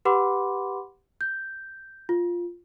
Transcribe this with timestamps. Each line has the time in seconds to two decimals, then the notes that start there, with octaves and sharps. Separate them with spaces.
0.05 G4 B4 F#5 B5 C6 D6
1.21 G6
2.09 F4